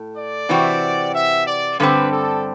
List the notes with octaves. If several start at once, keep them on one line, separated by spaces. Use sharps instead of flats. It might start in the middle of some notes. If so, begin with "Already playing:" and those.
Already playing: A2
D5
C3 E3 C4 F#4
E5
D5
G2 D3 G3 C4 B4
A4